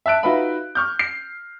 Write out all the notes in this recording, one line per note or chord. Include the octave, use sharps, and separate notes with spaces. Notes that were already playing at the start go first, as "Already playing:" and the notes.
E5 A5 F#6 D7
D#4 F4 F#4 B4 E5 B5
C#6 F6 G6
C7